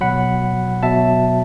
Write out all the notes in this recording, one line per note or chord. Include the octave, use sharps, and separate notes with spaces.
B2 F#3 F#5 B5
B2 F#3 E5 A5